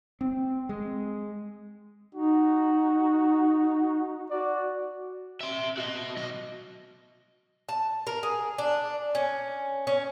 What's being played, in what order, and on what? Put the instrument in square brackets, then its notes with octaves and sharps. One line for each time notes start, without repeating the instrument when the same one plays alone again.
[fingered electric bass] C4
G#3
[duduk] D#4 [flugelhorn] F#4
[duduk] F#4 [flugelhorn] D5
[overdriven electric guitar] E5 C6
F#4 D#5
B1 D#5
[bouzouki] A5
A#4
G#4
D4
C#4
C#4